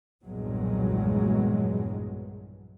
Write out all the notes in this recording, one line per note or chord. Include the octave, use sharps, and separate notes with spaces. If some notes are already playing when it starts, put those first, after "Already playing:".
B1 E2 G2 A#2 F#3 G#3